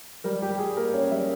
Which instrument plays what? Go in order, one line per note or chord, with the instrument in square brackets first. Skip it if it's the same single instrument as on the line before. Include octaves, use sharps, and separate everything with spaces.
[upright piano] G3 A#4
G3 G4
G3 G#4
A#3 A#4
C#4 C#5
G3 E5